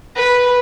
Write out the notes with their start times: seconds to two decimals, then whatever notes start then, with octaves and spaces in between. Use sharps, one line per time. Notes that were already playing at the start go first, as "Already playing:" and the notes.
0.15 B4